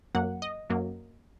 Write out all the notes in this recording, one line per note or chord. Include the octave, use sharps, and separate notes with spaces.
F#2 F#3 A#3 F#5
D#5
F#2 F#3 A#3